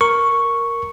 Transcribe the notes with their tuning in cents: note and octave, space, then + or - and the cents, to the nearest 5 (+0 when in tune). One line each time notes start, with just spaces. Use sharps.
A#4 +0 C#6 +0